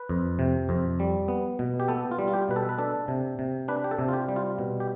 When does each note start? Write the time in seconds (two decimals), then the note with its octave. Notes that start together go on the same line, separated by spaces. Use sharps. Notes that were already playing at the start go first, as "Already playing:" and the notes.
Already playing: B4
0.09 F2
0.39 C3
0.69 F2
1.00 G3
1.28 B3
1.59 B2
1.80 G4
1.88 B3 A4
2.11 F4
2.19 G3
2.28 F4
2.33 G4
2.49 B2 B4
2.56 A4
2.69 B4
2.79 D4 A4
3.08 C3
3.39 C3
3.68 D4 B4
3.84 G4
3.91 A4
3.99 C3
4.09 F4
4.13 G4
4.29 G3
4.36 F4
4.59 B2
4.80 G4